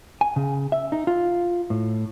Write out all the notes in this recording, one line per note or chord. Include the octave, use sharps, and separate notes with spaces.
G#5
C#3
E5
D#4
F4
A2